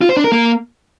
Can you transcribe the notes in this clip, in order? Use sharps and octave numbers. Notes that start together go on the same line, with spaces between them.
F4
C5
D4
A#4
A#3